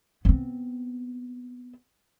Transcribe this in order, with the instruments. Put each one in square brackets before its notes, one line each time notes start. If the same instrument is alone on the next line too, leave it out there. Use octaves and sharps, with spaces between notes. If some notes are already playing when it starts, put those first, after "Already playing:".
[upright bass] B3 C4